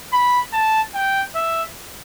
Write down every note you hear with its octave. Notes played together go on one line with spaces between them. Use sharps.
B5
A5
G5
E5